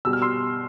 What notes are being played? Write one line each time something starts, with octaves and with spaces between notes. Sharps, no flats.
B2 G3 E6
F6
C6 E6